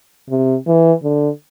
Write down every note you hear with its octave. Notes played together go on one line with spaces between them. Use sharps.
C3
E3
D3